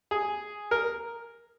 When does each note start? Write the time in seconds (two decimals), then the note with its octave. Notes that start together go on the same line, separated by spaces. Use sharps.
0.11 G#4
0.71 A#4